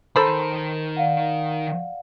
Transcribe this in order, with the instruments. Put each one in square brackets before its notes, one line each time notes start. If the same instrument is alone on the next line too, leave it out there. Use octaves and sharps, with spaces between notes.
[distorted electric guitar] D#3 A#5 [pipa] A4 C5 B5
[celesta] D5 F5 F#5